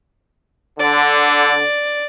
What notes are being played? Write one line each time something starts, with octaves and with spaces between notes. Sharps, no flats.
D3 D5